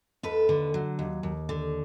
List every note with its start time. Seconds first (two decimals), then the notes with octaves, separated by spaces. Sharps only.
0.23 D#2 A4 B4
0.49 D3
0.74 F#3
0.99 D#2
1.23 D#2
1.49 D3